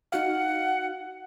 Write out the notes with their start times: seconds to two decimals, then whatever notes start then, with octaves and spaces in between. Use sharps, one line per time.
0.12 D#4 F#4 F5 F#5